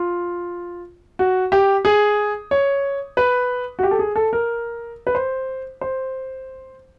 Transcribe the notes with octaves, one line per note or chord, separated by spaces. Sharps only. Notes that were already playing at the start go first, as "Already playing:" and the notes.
Already playing: F4
F#4
G4
G#4
C#5
B4
F#4
G4
A4
G#4
A4
A#4
B4
C5
C5